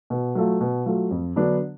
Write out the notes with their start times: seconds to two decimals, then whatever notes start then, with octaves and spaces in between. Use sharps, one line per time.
0.10 B2
0.35 F#3 A3 F4
0.61 B2
0.86 F#3 A3 F4
1.11 F2
1.36 D3 F#3 B3 D4